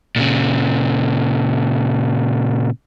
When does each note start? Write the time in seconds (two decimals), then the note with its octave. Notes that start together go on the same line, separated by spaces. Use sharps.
0.16 A#2 C#3